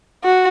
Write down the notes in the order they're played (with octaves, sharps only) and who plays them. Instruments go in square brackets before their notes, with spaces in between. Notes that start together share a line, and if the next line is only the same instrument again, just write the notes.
[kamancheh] F#4